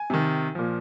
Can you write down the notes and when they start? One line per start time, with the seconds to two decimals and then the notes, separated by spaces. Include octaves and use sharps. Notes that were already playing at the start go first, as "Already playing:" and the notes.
Already playing: G#5
0.10 C3 D#3
0.55 A#2 F3